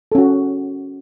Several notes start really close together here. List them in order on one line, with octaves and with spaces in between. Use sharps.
A4 C#4 F#4